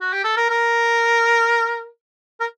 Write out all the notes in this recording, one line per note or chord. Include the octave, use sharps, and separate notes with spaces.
F#4
G4
A4
A#4
A#4
A#4